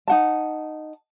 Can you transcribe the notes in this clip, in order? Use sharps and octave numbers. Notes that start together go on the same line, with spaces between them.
D#4 F#5 A5